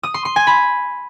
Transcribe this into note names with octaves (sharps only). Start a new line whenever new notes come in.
D#6
C6
C6
G#5
B5